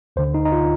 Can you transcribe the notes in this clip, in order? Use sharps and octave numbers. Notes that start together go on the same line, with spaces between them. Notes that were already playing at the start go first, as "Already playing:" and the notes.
D2 D3 C5
D#4
D#4
F4